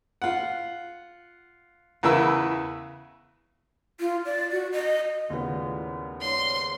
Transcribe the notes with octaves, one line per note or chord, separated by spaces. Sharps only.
F4 F#5
E2 C#3 E4 A#4 B4 E6
F4
D5
F#4
D#5
D#2 A2 C#3 B3 F4 D5
G#2 C#5 D5 C6